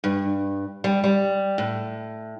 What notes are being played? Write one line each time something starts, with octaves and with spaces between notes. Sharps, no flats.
G2
G3
G3
A2